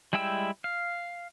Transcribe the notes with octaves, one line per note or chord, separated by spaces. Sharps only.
G3 G#3 E4 G5 E6
F5